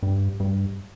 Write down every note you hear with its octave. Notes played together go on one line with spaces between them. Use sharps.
G2
G2